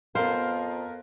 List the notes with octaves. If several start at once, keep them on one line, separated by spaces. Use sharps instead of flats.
F2 B3 A#4 C5 F5